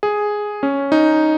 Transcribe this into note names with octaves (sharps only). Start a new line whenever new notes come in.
G#4
C#4
D#4